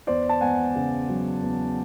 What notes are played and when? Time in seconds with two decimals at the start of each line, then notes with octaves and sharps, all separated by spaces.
0.07 E2 C5 D5
0.29 A5
0.41 E2 F#5 G#5
0.75 C#3
1.09 F#3
1.43 E2